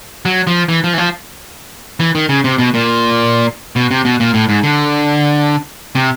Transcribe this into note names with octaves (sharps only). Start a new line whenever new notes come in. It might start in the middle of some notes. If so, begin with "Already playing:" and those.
F#3
F3
E3
F3
E3
F3
E3
D#3
C#3
C3
B2
A#2
B2
C3
B2
A#2
A2
G#2
D3
C3